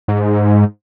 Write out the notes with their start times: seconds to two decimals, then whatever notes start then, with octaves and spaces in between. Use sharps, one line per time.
0.08 G#2